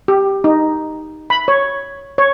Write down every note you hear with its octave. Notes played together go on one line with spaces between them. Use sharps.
G4
D#4
B5
C#5
C#5